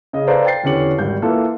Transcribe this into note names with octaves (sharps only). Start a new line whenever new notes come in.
C#3 D#5
A4 B4 C5 D5 F5 A#5
G5 A6 C7
E2 D3 C#4 G4 C#7 F#7
G#1 G3 G6
E3 A#3 F4 A4